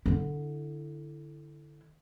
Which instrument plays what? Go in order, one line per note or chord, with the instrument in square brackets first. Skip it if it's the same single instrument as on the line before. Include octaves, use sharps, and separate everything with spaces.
[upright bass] D3 E4